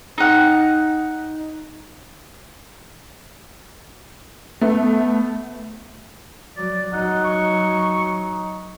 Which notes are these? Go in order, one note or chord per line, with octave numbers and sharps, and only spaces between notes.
D#4 F#5
A3 B3
F#3 D5
F#3 D#4 F#5
C#6